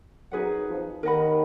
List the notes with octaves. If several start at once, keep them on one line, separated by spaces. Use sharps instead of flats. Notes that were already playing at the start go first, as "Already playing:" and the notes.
F#2 F#3 D#4 G#4 B4 F#5
F2 F3
D#2 D#3 A#4 D#5 F#5 B5